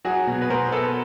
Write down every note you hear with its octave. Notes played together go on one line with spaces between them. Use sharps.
F#3 F#4 G#4
B2
B4
B2 A#4 C5
B3 A4 B4